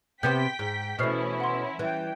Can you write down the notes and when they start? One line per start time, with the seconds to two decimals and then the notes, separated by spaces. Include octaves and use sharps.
0.23 C3 B3 C4 G5 G6 B6
0.59 G#2
0.99 B2 E3 A3 C#4 E4 C5 F6 C7
1.40 F#5 C6
1.79 E3 G3 G5